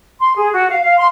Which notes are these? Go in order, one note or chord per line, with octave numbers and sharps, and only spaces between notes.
C6
G#4
F#4
F5
F5
C6